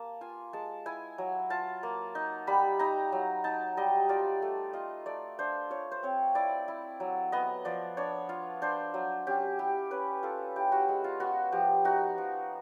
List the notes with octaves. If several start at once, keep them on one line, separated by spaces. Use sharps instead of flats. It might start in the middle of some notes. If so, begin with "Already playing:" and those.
Already playing: A#3 A5
F4 G#5
G#3 A5
E4 G#5
F#3
F4 A5
A#3
D#4
G3 B5
D#4 A#5
F#3
D#4 A5
G3 D#5
F4 D5
A3
F4 D#5
A3 D5
D4 C5
F4 C#5
C5
C4 C#5
E4 D5
E4
F#3
B3 D#5
F3 D5
D4 C#5
F4
D4 C5
F#3
C#4 G4
E4 G4
C#4 B4
F4 A4
E4 G4
F#4
G#3
F4
B3 F#4
F3 G4
D#4 F#4
F3